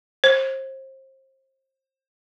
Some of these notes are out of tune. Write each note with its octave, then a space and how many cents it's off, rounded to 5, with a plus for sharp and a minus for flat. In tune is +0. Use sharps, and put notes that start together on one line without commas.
C5 +30